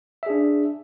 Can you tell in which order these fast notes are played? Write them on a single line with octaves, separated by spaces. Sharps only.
E5 G#4 D4